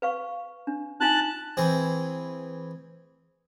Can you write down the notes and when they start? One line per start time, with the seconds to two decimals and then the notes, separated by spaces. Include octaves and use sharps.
0.02 B4 F5 C#6
0.67 D4
1.01 D#4 F4 G#5 A5 F#6
1.57 E3 C4 G#4